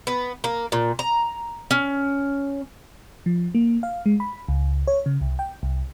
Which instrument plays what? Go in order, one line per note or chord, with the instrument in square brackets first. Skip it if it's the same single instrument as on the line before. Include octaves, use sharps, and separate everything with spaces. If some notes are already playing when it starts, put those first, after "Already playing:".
[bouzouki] B3
A#3
A#2
A#5
C#4
[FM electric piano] F3
A#3
F5
G#3
B5
C#2
C#5
C#3
C2
G5
C2